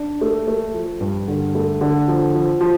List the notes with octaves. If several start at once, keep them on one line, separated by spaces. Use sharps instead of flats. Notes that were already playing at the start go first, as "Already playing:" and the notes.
Already playing: D4
A3
A3
F3
G2
D3
A3
D3
F3
F3
F3